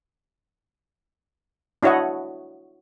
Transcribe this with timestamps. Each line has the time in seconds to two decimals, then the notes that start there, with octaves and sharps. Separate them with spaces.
1.83 D4 E4 F#4 C#5 D#5 F#5